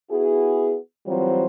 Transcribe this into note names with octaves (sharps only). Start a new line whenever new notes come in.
B3 E4 F#4 G#4
E3 F#3 G3 C4 F4 C5